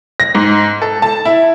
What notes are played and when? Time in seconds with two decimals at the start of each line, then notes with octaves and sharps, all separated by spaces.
0.20 A#6
0.35 G#2
0.82 A4
1.02 A5
1.25 E4